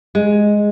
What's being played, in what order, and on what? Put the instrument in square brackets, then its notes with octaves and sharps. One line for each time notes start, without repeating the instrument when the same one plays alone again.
[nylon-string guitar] G#3